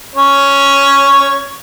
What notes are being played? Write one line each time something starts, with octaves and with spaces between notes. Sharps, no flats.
C#4 C#5